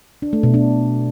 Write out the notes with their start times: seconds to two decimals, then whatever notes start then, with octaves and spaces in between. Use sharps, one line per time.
0.22 D4
0.33 A3
0.43 B2
0.54 D4